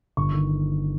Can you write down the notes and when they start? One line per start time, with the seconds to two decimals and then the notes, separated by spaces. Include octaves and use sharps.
0.17 G1 C#6
0.32 D#3